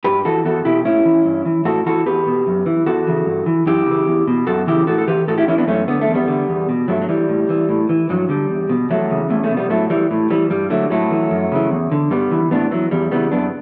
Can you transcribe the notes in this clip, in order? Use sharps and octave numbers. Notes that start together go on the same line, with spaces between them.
G2 G4 B4
E3 F#4 A4
E2 F#4 A4
B2 E4 G4
A2 C#4 E4
E3
G2
E3
A2 F#4 A4
E3 F#4 A4
E2 G4 B4
B2
F#2
E3
E2 F#4 A4
C#3 E3
G2
E3
F#2 E4 G4
C#3 E3
E2
B2
F#2 F#4 A4
C#3 E3 E4 G4
A2 F#4 A4
A4
E3 G4 B4
A2 F#4 A4
E4 G4
E3 C#4 E4
B3 D4
F#2 A3 C#4
D3 B3
A3
E2
G3 B3
D3
E2
B2
G2 F#3 A3
F#3
E3 G3
A2
E3
A2
E3
G2 F#3
D3 G3
E2
B2
E2 F#3 A3
C#3 E3
E2 A3 C#4
A3 C#4
B2
G3 B3
A2 F#3 A3
E3 G3
A2
E3 G3
G2 G3
D3 F#3 A3
A2 F#3 A3
E3
F#2
C#3 E3
E2
D3
G2 G3 B3
E3
A2 B3 D4
E3 F#3
E2 G3
C#3 E3 G3 B3
F#2 B3 D4